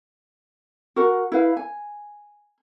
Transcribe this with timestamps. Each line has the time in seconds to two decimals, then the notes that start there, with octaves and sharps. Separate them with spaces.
0.96 F#4 A#4 F#5
1.32 E4 B4 F5
1.57 G#5